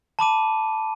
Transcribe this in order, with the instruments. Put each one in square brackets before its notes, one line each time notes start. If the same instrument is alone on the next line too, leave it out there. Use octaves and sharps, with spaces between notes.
[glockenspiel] A5 B5 D6 D#7